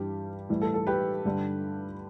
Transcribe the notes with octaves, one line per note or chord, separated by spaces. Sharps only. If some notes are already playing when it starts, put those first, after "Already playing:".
Already playing: G2 E3 G3 G4
A2 E3 G3
A4
A4
G4 B4
G2 D3 G3